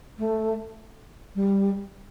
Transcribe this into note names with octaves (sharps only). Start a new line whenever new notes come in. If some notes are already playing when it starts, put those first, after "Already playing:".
A3
G3